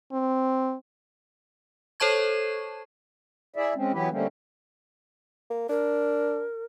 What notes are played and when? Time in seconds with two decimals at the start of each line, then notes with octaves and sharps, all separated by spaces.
0.12 C4
2.00 A4 C5 C#5 A5 C#6 G#6
3.56 E4 G#4 D5 E5
3.75 G#3 C4 C#4
3.92 E3 F#3 B3 E4 G4 B4
4.10 D3 G3 A3 A#3 C4 C#4
5.50 A#3
5.69 D4 A#4